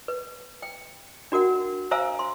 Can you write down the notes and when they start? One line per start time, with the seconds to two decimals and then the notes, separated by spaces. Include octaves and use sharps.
0.08 B4
0.62 G5
1.32 D4 F#4 A#4 F#5
1.91 C5 E5 F5 G#5 A#5 E6
2.19 C6